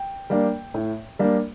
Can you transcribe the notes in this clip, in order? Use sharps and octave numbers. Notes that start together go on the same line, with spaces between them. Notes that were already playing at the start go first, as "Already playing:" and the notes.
Already playing: G5
G3 A#3 D4
A2
G3 A#3 D4